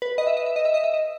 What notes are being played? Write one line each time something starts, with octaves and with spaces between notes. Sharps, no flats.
B4
D#5
E5
D#5
E5
D#5
E5
D#5
E5
D#5